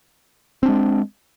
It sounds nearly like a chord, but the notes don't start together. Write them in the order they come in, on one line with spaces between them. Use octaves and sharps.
C4 D4 G#3